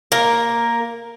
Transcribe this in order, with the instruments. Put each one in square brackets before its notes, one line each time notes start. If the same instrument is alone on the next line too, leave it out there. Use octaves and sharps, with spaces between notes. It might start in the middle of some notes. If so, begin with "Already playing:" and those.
[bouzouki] A#3 A#4